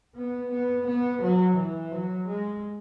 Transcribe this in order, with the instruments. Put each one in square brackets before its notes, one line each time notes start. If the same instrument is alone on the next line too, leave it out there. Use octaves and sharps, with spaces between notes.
[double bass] B3
B3
B3
F#3
E3
F#3
G#3